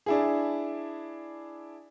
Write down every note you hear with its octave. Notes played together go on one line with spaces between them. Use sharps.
D4 E4 G#4